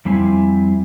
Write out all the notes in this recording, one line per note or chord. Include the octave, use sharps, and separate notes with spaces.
F2 G3 C4 E4 G#5